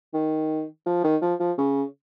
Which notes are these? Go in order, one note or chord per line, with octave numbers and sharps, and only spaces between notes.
D#3
F3
D#3
F3
F3
C#3